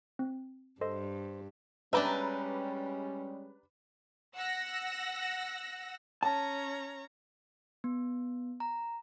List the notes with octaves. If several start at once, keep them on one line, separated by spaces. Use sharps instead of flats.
C4
G2 A4 C5 D#5
G3 G#3 C#4 D4 G4 B4 E5 A#5
F#5 E6 A#6
C#4 C#5 A5 A#5
B3
A#5